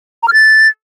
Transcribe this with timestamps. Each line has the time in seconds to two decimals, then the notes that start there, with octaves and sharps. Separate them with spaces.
0.23 A#5
0.28 F6
0.33 A6